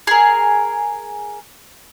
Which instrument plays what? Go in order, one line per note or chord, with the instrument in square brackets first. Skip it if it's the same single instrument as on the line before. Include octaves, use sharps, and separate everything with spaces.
[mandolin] G#4 A#4